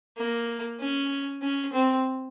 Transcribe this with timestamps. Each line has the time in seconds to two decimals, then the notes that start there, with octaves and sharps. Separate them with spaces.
0.17 A#3
0.80 C#4
1.42 C#4
1.73 C4